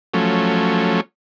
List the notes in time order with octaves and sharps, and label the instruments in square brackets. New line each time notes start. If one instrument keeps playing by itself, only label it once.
[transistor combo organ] F3 F#3 A3 C#4